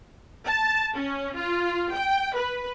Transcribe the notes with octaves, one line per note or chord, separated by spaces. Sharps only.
A5
C#4
F4
G5
B4